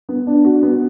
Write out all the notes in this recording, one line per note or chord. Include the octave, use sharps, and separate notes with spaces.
B3
D4
F#4
B3